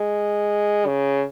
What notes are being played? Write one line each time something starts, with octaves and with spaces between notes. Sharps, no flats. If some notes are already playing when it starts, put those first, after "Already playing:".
Already playing: G#3
C#3